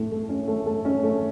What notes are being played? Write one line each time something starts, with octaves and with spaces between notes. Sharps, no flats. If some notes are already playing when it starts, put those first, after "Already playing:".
Already playing: A2 A3
A3
C#4
A3
A3
C#4
A3